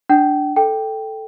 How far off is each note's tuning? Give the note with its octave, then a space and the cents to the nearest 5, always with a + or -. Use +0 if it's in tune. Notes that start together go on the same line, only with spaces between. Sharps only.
D4 +0 G5 -40
A4 +0 G5 +0